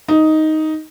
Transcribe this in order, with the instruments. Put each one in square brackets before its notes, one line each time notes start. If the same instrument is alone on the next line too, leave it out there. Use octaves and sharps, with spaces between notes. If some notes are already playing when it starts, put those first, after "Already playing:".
[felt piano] D#4